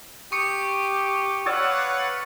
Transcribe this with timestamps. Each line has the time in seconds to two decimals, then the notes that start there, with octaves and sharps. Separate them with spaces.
0.32 G4 C#6 D#6 C#7
1.46 B4 C#5 D5 F5 F#5 E6